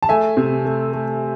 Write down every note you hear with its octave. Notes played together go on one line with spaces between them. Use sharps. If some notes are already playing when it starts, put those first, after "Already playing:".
A5
A3 E5 G#5
C3
A3
A3